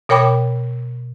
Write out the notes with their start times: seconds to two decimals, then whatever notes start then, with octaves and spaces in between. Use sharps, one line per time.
0.09 B2 A#4 C#5 G5 B5 D6